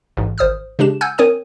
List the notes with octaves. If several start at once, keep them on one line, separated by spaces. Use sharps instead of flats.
A1 G#2
G#1 C5 D#6 F6
C#3 G#3 D4 G4 E7
F#5 G#5 E6 F6 G6 G#6
C4 A#4 C#5 G#5 D#6 D#7